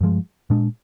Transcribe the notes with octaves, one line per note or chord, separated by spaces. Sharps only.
G2 F3 G#3
A#2 G#3 D4